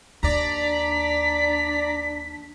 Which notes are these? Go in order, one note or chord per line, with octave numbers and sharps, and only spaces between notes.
D#2 D4 D5 A#5 B6